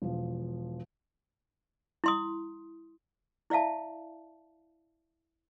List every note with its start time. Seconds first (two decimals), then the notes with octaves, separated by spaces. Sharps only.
0.02 E1 F3
2.04 E4 C6 D#6
3.50 E4 D5 E5 F5 A5